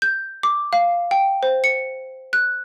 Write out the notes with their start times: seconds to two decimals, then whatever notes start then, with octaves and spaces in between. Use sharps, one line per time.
0.02 G6
0.43 D6
0.73 F5
1.11 G5
1.43 C5
1.64 C#7
2.33 F#6